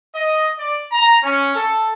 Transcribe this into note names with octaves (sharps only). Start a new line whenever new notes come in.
D#5
D5
A#5
C#4
A4